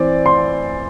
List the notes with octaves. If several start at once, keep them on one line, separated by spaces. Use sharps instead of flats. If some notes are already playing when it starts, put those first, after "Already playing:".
Already playing: E3 C4 D5
C6